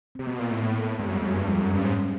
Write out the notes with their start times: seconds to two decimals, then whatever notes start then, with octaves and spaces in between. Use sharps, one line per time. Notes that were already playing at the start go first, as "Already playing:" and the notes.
0.15 C3 C4
0.27 B2 B3
0.39 A#2
0.51 A2
0.63 A#3
0.99 G2 G#3
1.08 F#2 G3
1.17 F2
1.21 G#3
1.28 F#2
1.36 G2 G3
1.48 F2
1.60 F#2 C4
1.73 G2 C#4
1.84 G#2